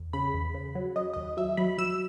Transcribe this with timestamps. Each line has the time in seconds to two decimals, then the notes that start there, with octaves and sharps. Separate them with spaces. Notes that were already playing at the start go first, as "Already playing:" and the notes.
Already playing: E2
0.13 C#3 B5
0.34 E2
0.54 C#3
0.75 F#3
0.96 F#3 D#5
1.13 D#2 D#5
1.37 F#3 E5
1.57 F#3 B5
1.78 F#3 E6